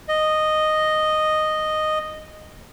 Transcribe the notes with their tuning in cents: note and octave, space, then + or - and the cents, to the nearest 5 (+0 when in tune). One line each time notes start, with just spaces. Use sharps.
D#5 -5